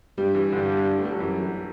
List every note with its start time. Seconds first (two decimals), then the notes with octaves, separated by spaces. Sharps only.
0.18 G2 G3
0.35 E3
0.52 G2 D3
0.98 A3
1.05 G3
1.13 F#3
1.20 F#2 E3